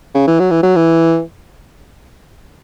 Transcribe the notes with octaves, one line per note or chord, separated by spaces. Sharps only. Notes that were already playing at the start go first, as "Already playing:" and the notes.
C#3
E3
F#3
E3
F#3
E3